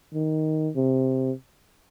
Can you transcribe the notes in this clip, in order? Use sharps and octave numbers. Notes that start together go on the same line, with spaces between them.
D#3
C3